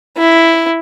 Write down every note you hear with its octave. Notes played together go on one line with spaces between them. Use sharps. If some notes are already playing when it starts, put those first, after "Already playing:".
E4